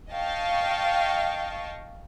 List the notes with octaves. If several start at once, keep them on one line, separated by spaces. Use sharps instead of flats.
D#5 F5 G5 A5 C#6